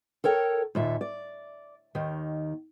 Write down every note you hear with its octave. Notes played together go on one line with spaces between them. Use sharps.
A4 A#4 C#5 G5
D#2 A#2 E5
D5
D#2 D#3